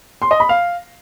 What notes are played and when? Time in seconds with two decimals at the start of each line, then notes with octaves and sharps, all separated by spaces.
0.22 C6
0.31 D#5
0.40 B5
0.49 F5